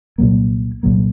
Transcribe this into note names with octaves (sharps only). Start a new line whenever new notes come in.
C2 A#2 F#3 A#3
C2 A#2 F#3 A#3